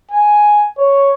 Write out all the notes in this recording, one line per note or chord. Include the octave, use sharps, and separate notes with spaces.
G#5
C#5